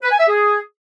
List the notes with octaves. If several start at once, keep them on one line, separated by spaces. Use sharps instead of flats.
B4
G#5
E5
G#4